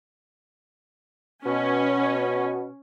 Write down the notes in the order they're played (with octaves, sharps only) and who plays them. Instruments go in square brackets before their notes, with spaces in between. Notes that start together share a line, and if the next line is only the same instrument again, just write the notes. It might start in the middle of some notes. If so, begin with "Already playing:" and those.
[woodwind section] B2 [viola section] C#4